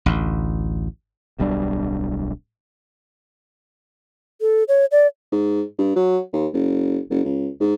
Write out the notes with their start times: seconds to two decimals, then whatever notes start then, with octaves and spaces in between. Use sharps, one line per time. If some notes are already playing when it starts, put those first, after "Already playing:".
0.06 A1 D2
1.39 D1 B1 G3 D4
4.41 A4
4.68 C#5
4.92 D5
5.32 G#2
5.78 G2
5.95 F#3
6.33 D#2
6.53 F#1
7.10 F#1
7.24 C#2
7.60 G#2